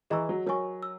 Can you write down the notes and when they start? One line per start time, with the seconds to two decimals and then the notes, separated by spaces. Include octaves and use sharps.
0.10 E3 G#4 D#5 A#5 C#6 E6
0.29 F#3
0.47 F#3 A#4 C#5 G#5 C#6
0.83 E6